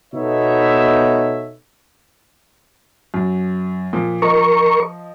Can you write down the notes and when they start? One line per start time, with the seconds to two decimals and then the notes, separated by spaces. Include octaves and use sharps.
0.14 B2 B3 D#4 A4 C#5 E5
3.14 F#2
3.93 A#2 F3
4.22 F3 A#4 D#5 C#6